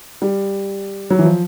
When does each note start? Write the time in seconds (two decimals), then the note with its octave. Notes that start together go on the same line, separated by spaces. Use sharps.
0.22 G3
1.10 F#3
1.19 E3
1.25 F3